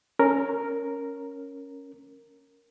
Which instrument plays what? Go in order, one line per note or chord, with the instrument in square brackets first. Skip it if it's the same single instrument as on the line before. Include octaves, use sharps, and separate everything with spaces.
[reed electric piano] C#4 A#4